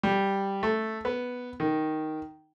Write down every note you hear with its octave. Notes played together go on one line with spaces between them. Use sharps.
G3
A3
B3
D#3